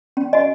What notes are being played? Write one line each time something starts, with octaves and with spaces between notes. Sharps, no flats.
C#4
F#4 D#5 G#5